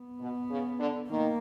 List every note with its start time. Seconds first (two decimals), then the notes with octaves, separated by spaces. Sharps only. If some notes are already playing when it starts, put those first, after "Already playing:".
Already playing: B3
0.20 B2
0.50 C#3
0.79 D3
1.09 D#3 A#3